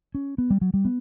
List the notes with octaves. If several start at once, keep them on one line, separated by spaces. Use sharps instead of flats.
C#4
B3
G3
F#3
G3
B3